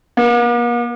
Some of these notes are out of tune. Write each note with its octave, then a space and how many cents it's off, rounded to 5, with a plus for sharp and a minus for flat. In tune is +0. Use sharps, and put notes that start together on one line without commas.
A#3 +45